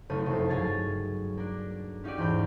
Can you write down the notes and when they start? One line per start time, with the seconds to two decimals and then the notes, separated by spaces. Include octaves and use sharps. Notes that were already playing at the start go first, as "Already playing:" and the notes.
0.10 F#1 C#3 A3 D#4 C#5 D#6
0.26 C2 F2
0.49 G2 F#3 G#4 C#5 G#6 A6
1.37 A#3 D4
2.04 C#4 D#4 F#4 G4 D5
2.18 E2 G#2 B5 G6